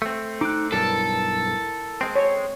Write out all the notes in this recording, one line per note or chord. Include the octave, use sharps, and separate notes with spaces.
A3 C4
D#4 D6 F#6
B1 G2 E4 A4 A#4
G#3 C4
C#5